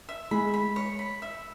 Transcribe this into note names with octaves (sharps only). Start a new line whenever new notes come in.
E5
G#3 B5
B5
C#5
B5
E5